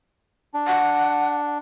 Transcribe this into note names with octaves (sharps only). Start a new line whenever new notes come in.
D4
F#5